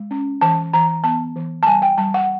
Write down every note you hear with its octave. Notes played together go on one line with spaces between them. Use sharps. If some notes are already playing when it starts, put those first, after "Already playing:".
Already playing: G#3
C#4
E3 A5
E3 A#5
B3 A5
E3
A5
G3 G#5
G5
G3 A5
F#5